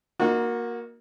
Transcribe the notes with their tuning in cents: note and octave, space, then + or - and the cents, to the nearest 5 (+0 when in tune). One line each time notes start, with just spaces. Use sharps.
A#3 +10 D#4 +20 F#4 -25